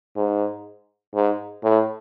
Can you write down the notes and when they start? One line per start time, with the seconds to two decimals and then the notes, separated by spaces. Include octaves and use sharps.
0.17 G#2
1.15 G#2
1.64 A2